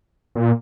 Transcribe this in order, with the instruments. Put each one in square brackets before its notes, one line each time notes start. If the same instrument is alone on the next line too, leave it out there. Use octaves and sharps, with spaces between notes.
[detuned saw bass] A#2